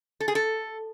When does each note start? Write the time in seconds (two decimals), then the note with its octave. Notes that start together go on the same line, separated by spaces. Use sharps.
0.20 A4
0.28 G#4
0.35 A4